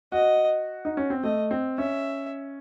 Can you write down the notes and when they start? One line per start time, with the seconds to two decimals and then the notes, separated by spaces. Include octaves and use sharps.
0.12 F#4 D#5
0.85 D#4
0.97 C#4
1.10 C4
1.23 A3 D#5
1.51 C4
1.78 C#4 E5